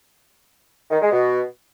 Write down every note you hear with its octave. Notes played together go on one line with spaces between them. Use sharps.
D#3
G#3
B2